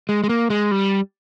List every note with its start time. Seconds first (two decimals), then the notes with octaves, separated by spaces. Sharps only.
0.09 G#3
0.24 G#3
0.29 A#3
0.50 G#3
0.71 G3